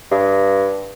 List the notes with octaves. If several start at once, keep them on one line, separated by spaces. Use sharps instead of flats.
G2